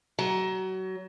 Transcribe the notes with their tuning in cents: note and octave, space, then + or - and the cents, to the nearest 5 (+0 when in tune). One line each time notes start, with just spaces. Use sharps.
F#3 +25